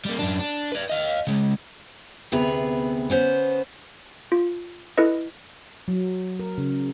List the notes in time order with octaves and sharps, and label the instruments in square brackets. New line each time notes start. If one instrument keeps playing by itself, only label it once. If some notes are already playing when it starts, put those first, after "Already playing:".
[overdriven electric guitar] G3 A#3
F#2 D4
D4
B4 D5
D#5 F5
C#3 G#3
[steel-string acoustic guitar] D2 C3 B3 G#4 B4 A#5
B3 C#4 C5
[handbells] F4
E4 A4 B4 D#5
[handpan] F#3
A#4
C#3